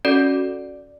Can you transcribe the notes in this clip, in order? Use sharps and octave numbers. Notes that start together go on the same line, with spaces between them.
C#4 F#4 A4 D5